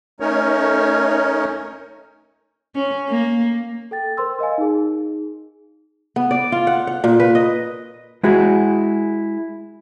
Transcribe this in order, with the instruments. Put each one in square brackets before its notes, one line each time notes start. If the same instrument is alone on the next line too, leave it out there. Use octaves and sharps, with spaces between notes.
[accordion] A3 C#4 D#4 A#4 C#5
[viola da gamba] C#4
A#3
[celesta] A4 G5 A6
A#4 C5 C6 E6
A#4 D#5 F5 G#5
D#4 G#4
[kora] B3
D5
F4
F#5
F#5
A#2
B4
D#5
[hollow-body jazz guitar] G#3 E4 F#4 G#4